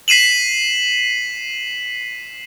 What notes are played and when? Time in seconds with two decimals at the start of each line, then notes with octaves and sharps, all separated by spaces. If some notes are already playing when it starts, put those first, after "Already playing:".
0.08 B6 C7 D#7 E7 F#7